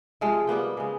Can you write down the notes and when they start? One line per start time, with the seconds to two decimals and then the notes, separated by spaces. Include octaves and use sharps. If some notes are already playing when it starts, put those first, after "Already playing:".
0.21 C3 F3 G#3 F4
0.47 G3 A#3 B3 G5
0.77 C#3 G#3